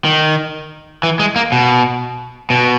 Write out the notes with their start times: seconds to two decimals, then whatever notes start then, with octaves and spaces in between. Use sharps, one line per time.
0.05 D#3
1.03 E3
1.19 G#3
1.36 A#3
1.52 B2
2.50 B2